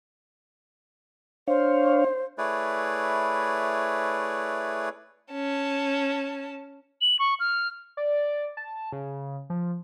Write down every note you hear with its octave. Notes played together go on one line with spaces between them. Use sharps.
D4 C5 C#5 F5
A3 E4 G#4 B4 C#5 D5
C#4 A5
F#7
C#6
F6
D5
A5
C#3
F3